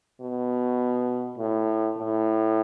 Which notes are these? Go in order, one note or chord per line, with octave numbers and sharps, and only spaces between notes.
B2
A2
A2